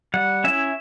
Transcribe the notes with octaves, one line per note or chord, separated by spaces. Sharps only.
G3 F#5
C#4 E4 E5